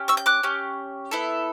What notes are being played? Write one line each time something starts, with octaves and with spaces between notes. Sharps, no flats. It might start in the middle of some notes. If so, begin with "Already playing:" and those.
Already playing: C#4 G4
C#6 E6
G6
D6 F#6
C#4 G4
B3 E4 A4